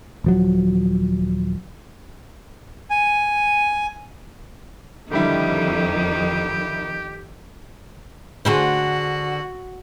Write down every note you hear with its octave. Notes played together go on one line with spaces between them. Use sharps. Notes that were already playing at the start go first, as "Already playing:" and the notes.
D#1 F3 F#3
G#5
F2 D3 D#3 G3 E4 G4
D3 F#4 G#4 C5